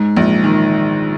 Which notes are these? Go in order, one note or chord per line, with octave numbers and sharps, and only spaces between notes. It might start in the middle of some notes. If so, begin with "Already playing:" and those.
Already playing: G#2
A#1
D#3